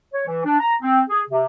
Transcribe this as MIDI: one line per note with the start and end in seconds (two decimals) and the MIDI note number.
0.14 0.26 73
0.27 0.44 52
0.45 0.58 62
0.60 0.74 82
0.82 1.01 60
1.09 1.21 68
1.29 1.46 48